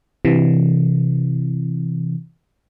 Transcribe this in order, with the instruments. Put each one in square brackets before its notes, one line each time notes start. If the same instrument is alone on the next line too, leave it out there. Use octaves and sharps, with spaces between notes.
[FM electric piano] C3 E3